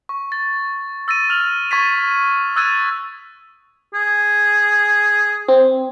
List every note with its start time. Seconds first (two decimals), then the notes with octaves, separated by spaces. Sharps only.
0.09 C#6
0.32 A6
1.08 E6 A6 A#6 D#7
1.29 F6 F7 F#7
1.71 C#6 G#6 A6 B6 D#7
2.56 D#6 E6 F#6 G#6 A6 D#7
3.94 G#4
5.49 C4